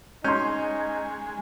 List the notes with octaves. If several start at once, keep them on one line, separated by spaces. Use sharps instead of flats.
G#3 C#4 D#4 C6 G6